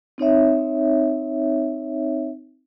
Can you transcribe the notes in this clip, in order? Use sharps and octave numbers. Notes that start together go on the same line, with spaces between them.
C4 D#4 C#5 E5